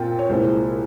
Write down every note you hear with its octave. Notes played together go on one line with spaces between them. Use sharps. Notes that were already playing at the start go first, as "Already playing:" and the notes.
Already playing: A#2 C4 F4 G5
C#5
C2 A#2 G#3 E4 C5